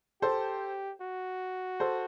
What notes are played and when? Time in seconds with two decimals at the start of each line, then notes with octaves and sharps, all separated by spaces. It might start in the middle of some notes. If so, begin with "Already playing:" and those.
0.22 G4 A4 C5
1.01 F#4
1.80 A4 C5